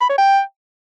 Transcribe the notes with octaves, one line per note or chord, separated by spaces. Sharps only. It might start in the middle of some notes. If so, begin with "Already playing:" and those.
B5
C#5
G5